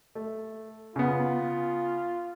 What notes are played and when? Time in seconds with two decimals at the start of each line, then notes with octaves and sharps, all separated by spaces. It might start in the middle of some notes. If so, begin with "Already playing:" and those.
0.15 A3
0.96 C#3 B3 F4